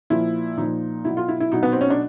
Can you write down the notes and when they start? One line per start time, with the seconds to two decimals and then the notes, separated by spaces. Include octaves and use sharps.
0.10 A#2 F3 E4
0.58 A#2 F3 D#4
1.05 B2 F#3 E4
1.17 F4
1.29 E4
1.40 E4
1.52 B2 F#3 D#4
1.63 B3
1.72 C4
1.81 C#4
1.90 D4